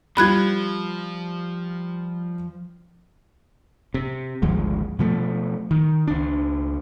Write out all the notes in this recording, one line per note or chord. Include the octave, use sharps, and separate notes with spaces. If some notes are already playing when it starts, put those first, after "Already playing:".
F3 G3 F4 B5 F#6 G#6
C3
G#1 D2 F3 G#3
B2 F3 A3
D#3
C#2 D4